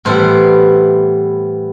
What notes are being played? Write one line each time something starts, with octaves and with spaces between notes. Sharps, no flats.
A2 E3 G3 B3 C5